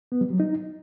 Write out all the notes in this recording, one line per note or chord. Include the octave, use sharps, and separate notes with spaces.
B3
G3
F#3
D#4